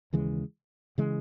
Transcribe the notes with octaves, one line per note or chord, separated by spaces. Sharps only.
D#2 C#3 E3 G#3
C#3 E3 G#3